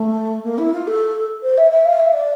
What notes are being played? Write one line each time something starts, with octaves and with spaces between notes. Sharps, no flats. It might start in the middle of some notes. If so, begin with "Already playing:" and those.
Already playing: A3
A#3
E4
F4
A4
C5
E5
E5
F5
E5
D5